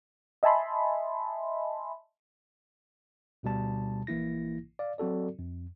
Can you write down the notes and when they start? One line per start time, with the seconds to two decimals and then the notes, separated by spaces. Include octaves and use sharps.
0.43 D#5 E5 G#5 A5 B5 C6
3.43 D2 B2 G3 A5
4.07 A#1 E3 A#3 E4 A#6
4.79 D5 F5
4.98 F#3 C4 F#4 A4 D5
5.39 F2